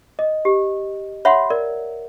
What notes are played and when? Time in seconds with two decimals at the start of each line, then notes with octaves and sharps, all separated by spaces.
0.19 D#5
0.45 G4
1.25 C#5 E5 F#5 B5 C6
1.50 A#4 D5